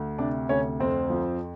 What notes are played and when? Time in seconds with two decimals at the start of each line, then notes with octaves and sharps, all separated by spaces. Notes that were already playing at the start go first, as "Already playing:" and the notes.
Already playing: D2
0.18 C3 D4 D5
0.49 D2 C#4 C#5
0.80 F2 C4 C5
1.10 F3